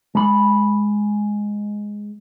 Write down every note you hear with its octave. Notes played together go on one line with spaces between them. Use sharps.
G#3 B5